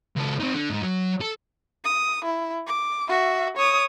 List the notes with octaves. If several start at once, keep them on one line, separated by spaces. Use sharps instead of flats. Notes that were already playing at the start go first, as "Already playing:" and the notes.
C#2 A4
C4 D#4
D3
G#2 G#3
F#3
A4
D#6
E4
D6
F#4 E5
C#5 D#6